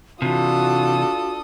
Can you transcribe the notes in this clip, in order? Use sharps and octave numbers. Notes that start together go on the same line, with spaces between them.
C3 E3 D4 F4 F#4 A4 D#6